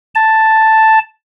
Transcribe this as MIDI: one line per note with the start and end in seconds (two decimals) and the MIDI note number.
0.15 0.99 81